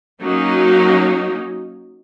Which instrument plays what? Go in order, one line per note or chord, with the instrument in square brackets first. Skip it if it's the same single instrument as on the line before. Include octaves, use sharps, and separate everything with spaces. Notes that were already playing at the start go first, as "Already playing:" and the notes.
[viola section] F#3 A#3 C#4 D#4